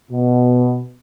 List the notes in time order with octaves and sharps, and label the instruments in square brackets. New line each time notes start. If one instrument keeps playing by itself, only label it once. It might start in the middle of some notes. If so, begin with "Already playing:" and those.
[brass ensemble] B2